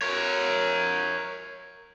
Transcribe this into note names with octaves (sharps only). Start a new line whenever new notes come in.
A#4 C#5